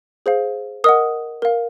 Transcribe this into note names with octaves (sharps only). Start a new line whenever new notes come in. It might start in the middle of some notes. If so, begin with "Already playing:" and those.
G#4 C5 F5
A#4 D#5 F#5 D#6
A#4 F5